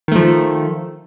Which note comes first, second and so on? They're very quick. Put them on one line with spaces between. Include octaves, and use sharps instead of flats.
D#3 A3 F3